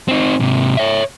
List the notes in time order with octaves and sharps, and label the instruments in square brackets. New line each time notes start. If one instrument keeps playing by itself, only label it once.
[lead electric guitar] C4 D#4
G#2 C3
C#5 E5